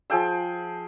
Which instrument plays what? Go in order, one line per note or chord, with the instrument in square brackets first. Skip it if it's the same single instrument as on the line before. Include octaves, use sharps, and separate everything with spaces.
[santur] F3 G#4 G5 E6